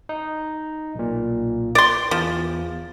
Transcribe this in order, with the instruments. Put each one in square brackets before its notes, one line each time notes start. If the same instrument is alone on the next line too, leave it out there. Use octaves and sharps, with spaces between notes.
[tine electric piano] D#4
B1 A#2
[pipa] D5 C6
[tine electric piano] E2 [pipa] F3